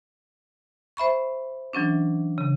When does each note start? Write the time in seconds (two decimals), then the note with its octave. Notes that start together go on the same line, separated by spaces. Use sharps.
0.97 C5 E5 B5 C#6
1.73 E3 F#3 C#4 D4
2.38 C#3